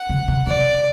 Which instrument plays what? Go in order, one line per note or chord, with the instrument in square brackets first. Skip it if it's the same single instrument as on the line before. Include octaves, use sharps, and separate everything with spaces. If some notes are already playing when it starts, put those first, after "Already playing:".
Already playing: [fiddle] F#5
[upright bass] C#3
C3
[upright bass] C3 [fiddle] D5